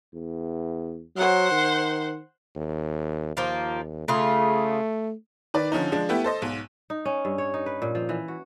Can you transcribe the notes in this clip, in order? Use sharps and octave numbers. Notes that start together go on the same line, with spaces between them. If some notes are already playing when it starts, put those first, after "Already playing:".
E2
F#3 C5 F#5
D#3
D#2
D#2 F3 A#3 F4
C#3 A3 F4 G#4
D#3 B4 D5
D3 F3 C#4 D#4
F3 G#3 D4
A3 B3 E4 G4
A4 C5 D#5
B1 G#2
D#4
C#4
G2
C#5
D#4
B4
A#2
F3
E3
F#4